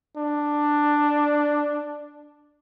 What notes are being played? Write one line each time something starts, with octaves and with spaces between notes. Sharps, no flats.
D4